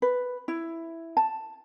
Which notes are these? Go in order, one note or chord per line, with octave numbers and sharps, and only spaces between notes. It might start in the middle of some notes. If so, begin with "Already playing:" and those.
B4
E4
A5